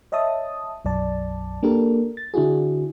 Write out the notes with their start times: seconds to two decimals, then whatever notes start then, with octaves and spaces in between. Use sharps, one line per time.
0.12 C#5 D#5 E5 A5 D#6
0.85 B1 F#2 D5 A5
1.63 A#3 D4 G4 A4 A#4
2.17 A6
2.34 D3 D4 E4 F#4 G#4